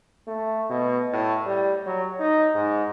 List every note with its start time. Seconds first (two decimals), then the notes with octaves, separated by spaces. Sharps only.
0.27 A3
0.70 B2
1.13 A2
1.45 G3
1.86 F#3
2.20 D#4
2.55 G#2